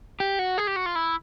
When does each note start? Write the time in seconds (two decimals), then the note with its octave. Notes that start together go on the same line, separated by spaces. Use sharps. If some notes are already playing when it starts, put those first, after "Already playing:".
0.20 G4
0.39 F#4
0.58 G#4
0.67 G4
0.76 F#4
0.86 F4
0.95 E4